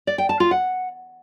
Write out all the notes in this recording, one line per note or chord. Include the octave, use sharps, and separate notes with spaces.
D5
G5
A5
F4
F#5